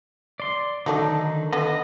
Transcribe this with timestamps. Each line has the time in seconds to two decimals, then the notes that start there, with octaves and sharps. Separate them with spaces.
0.40 D5 C6
0.86 D3 D#3 F#3 A3 D4 D#4
1.53 D3 B3 D#5